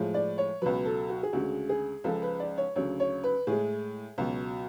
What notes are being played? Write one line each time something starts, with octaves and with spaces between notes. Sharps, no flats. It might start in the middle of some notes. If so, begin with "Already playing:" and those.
Already playing: A2 F3 G#3
D5
C#5
C#2 B2 F#3 B4
A4
F#4
G#4
D2 C#3 G#3 F#4
G#4
C#2 C#3 F3 G#3 A4
B4
D5
C#5
D2 C#3 F#3 C#5
C#5
B4
A2 G#3 G#4
C#2 B2 F#3